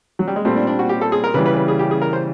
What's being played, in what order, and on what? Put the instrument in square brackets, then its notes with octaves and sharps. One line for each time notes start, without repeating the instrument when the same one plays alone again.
[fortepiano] F#3
G3
G#3
[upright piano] A#2 G3 C4 [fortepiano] A3
[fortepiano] D4
D4
F#4
G4
A4
G#4
A#4
[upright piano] C#3 E3 G3 [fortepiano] B4
[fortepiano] B4
B4
G#4
G4
G#4
A#4
C5